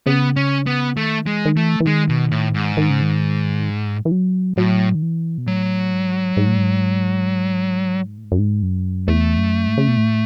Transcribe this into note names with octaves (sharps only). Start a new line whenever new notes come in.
C#3 B3
C#4
B3
D#3 A3
E3 G#3
D#3
E3 A3
E3
D#3 G#3
B2
A2
G#2
D#3
C#3
D#3
E3
F#3
A2 F#3
D#3
E3
B2
A2 F#3
G#2
G#2
A2
G#2
A2
G#2
F#2
G#2
F#2
E2 A3
F#2
G#2
C#3
B2
A2